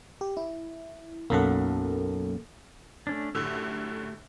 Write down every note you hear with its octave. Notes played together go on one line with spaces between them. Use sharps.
G4
E4
B1 F#2 A#3 A4 F#5
A3 C#4 D4
F#2 A2 D3 A3 G4 E6